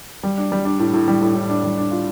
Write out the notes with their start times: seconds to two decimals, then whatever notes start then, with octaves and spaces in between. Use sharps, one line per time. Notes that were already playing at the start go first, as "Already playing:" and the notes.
0.23 G3
0.38 D4
0.52 G3
0.65 D4
0.79 A2
0.94 A2
1.08 G3
1.22 A2
1.35 A2
1.49 D4
1.64 G3
1.78 D4
1.91 F4